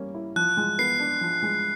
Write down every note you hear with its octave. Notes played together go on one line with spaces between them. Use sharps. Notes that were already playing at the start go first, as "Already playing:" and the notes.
Already playing: G3 A#3 C#4
E4
F3 F#6
G#3
B3 C7
D4
F3
G#3